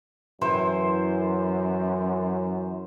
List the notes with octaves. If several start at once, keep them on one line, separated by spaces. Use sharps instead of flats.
F#2 E3 C5